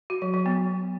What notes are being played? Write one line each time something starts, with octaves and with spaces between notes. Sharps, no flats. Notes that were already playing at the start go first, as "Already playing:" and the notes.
F#4
F#3
F#3
B3